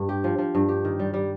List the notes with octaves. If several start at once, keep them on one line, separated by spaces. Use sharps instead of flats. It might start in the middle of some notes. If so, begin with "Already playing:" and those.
Already playing: G2
G4
F3
F3
G2
G4
D#3
G3
G3